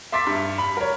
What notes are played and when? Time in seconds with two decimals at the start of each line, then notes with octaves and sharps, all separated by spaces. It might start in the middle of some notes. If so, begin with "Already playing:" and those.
0.12 E5 C6 D6 A6 B6
0.27 G2
0.58 B5
0.77 A#4 C#5